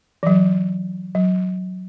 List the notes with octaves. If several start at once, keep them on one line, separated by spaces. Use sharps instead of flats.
E3
F#3
F#3